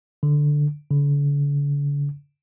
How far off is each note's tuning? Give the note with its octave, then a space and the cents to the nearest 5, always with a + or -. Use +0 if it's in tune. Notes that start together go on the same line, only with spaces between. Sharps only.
D3 +0
D3 -45